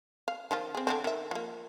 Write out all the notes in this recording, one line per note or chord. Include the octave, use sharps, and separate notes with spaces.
F5
D#3 F3 F4
C4 G#4
D3 E3 C4
D#3 E5
F3 A#3